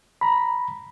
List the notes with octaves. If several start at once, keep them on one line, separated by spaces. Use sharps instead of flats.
A#5 B5